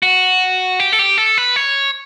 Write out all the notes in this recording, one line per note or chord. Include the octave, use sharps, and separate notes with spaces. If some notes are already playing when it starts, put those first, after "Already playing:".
F#4
G4
A4
G4
A4
B4
C#5